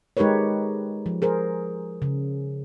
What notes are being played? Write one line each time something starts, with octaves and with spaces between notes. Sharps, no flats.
G#3 D#4 G4 A#4 B4 C#5
F3
G#4 A#4 C5
C#3